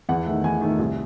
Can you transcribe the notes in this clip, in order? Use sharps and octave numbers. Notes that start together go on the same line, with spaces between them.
E2 F#5
D#3 A3
E2 G#5
D#3 A3
C2